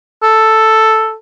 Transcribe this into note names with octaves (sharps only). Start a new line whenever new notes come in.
A4